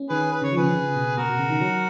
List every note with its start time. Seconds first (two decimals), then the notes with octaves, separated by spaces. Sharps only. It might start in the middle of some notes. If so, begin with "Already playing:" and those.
Already playing: C#4
0.09 D#3 G#4 B4
0.31 B4
0.42 C#3 C#5
0.53 F3
0.57 G#4 B4
0.63 C#3
0.74 C#3
0.96 B2
1.17 B2 F#4 A#4
1.29 B2
1.39 C#3
1.50 D#3
1.61 F#3